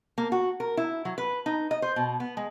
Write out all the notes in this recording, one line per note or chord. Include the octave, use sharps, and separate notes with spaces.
A#3
F#4
A#4
E4
F#3
B4
D#4
D#5
C5
B2
B3
G#3